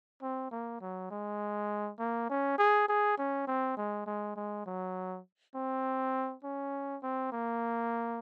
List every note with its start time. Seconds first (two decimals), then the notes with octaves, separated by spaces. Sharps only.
0.22 C4
0.51 A#3
0.81 F#3
1.11 G#3
1.99 A#3
2.29 C#4
2.58 G#4
2.88 G#4
3.18 C#4
3.47 C4
3.77 G#3
4.07 G#3
4.36 G#3
4.66 F#3
5.55 C4
6.44 C#4
7.03 C4
7.32 A#3